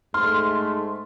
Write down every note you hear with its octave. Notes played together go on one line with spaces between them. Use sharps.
G#2 A3 C6 F6